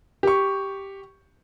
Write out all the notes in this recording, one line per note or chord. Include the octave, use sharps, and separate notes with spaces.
G4 C#6